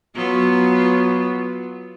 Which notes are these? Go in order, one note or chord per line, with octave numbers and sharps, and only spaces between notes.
F#3 B3 F4